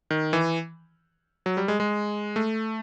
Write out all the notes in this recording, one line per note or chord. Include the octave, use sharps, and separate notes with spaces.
D#3
E3
F#3
G3
G#3
G#3
A3